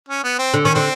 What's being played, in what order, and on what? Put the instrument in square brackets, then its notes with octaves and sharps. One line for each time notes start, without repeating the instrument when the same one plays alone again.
[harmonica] C#4
B3
C4
[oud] D3
[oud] D#3 [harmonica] C#4
[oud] D3 [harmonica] C4